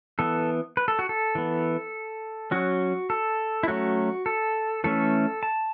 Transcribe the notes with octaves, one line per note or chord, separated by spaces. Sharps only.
E3 B3 A4
B4
A4
F#4
A4
E3 B3
F#3 C#4 F#4
A4
E4
F#3 A3 C#4 F#4
A4
E3 A3 C#4 A4
A5